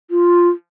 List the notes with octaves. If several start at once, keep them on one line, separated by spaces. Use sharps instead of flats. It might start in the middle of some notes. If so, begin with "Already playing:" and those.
F4